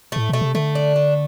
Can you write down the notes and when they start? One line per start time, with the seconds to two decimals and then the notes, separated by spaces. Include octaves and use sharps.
0.12 A2 A3
0.29 B2 A3
0.41 C3
0.55 D3 A3
0.75 D4
0.96 A3